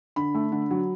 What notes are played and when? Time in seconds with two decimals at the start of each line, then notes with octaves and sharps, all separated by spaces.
0.16 D3 B5
0.35 A3
0.52 D3
0.71 F#3